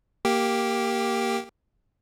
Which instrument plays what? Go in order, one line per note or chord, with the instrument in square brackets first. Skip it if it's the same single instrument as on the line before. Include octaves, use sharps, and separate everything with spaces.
[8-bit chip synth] A#3 G4